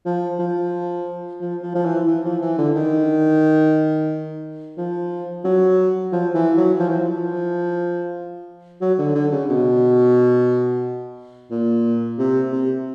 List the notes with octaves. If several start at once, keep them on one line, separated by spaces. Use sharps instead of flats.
F3
F3
F3
F3
F3
E3
E3
F3
E3
D3
D#3
F3
F#3
F3
E3
F#3
F3
E3
F3
F#3
D3
D3
C#3
B2
A#2
C3
C3